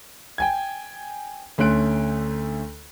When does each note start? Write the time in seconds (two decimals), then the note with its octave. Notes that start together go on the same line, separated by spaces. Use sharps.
0.38 G5 G#5 G#6
1.58 D2 A3 C#4 C6 F#6 D7